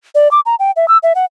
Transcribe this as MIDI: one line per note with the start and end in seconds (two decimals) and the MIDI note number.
0.15 0.31 74
0.31 0.40 86
0.46 0.55 82
0.59 0.71 79
0.76 0.88 76
0.88 0.98 88
1.03 1.13 76
1.15 1.25 78